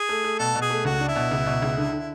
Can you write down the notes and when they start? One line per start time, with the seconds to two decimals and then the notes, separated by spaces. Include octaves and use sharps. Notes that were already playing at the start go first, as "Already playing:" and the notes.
Already playing: G#4
0.09 A3
0.24 A3
0.39 B2 A4
0.55 B2
0.62 G#4
0.70 A3
0.85 C#2 F#4
1.00 D4
1.08 E4
1.16 B2
1.31 C#2
1.46 B2
1.62 C#2
1.77 D3
1.93 D3